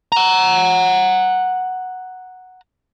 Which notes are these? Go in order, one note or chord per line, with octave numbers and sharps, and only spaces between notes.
F#5 A#5